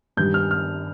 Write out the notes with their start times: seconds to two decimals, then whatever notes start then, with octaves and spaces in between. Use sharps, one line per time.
0.17 G2 D#3 G3 G6
0.34 F6
0.51 F6